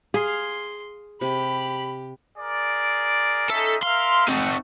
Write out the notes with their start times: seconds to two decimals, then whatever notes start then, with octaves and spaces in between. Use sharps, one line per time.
0.14 G#4 F5 C6
1.21 C3 G4 B5
2.37 G#4 A#4 D5
3.50 C#4 D#4 A4 E5
3.83 A#4 E5 F5 C6
4.28 A3 C4 D#4 F#4